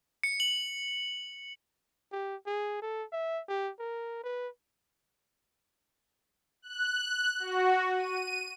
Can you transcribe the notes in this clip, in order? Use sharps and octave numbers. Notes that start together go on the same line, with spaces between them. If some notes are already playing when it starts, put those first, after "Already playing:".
C#7
F#7
G4
G#4
A4
E5
G4
A#4
B4
F#6
F#4
D#7